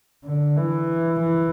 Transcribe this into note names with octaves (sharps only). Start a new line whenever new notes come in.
D3
E3
E3